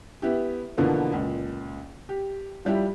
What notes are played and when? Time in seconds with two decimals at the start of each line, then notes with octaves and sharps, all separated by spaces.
0.22 B3 E4 G4
0.77 B2 D3 E3 F3 A#3 B3
1.13 C#2 A#2
2.09 G4
2.65 F3 G3 E4 G4